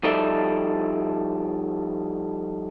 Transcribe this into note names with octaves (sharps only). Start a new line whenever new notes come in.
F3 G3 D#4 A4 D5 E5